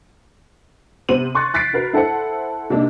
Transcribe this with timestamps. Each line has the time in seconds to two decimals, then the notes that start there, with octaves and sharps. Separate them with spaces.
1.09 C3 B3 C5 D#7 F#7
1.35 C6 C#6 F#6 A6
1.54 F#6 A6 B6 C7 D7
1.73 F#4 A#4 B4
1.93 E4 A4 C5 F#5 C#7
2.70 C3 A#3 D4 D#4